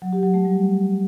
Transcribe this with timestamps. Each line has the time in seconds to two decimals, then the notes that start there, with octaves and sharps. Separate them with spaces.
0.02 F#3
0.13 G4
0.23 F#3
0.34 A3
0.45 G3